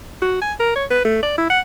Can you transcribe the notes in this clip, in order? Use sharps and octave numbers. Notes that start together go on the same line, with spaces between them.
F#4
G#5
A#4
C#5
B4
A3
D5
E4
F#5